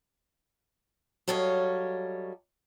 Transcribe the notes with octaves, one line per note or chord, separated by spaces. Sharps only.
F#3 G3 A4 C#5 D#5 F5